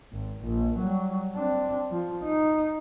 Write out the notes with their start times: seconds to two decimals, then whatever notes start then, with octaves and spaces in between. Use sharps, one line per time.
0.13 G#1
0.43 A#1
0.78 F#3 G3
1.35 C4 D4
1.91 F3
2.24 D#4